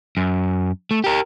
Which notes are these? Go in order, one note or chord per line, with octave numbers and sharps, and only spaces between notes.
F#2
A3
G4 A#4